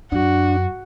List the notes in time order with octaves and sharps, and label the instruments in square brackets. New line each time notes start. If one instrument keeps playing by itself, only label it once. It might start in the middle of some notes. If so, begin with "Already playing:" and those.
[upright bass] F#2 [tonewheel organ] D4 [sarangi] F#4